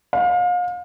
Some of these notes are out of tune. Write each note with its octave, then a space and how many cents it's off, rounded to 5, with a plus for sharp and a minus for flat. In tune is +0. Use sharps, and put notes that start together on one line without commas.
F5 +35